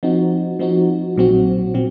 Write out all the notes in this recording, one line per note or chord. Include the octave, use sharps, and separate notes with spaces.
F3 C4 D#4 F#4
F3 C4 D#4 F#4
A#1 A#2 F#3 C4 F#4
A#2 F#3 C4